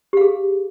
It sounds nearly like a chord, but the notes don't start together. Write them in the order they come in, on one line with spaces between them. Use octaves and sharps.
G4 F5 G#4